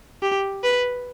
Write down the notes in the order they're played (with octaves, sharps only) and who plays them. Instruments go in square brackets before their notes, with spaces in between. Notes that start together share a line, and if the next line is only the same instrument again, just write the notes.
[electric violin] G4
B4